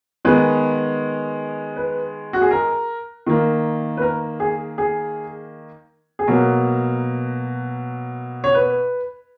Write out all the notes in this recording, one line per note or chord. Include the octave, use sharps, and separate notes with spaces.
D#3 G#3 B3 B4
B4
F#4
G#4
A#4
D#3 A#3
B4
A#4
G#4
G#4
G#4
B2 F#3 A#3 A#4
C#5
B4